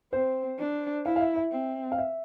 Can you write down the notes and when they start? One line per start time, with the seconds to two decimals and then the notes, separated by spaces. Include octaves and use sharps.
0.12 C4 C5
0.59 D4
1.05 E4 F5
1.16 F5
1.21 E5
1.36 E5
1.52 C4
1.92 F5
1.98 E5